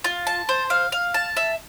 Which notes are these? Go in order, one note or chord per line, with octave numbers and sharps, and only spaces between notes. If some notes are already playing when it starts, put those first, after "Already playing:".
F4
A5
C5
F5
F5
A5
E5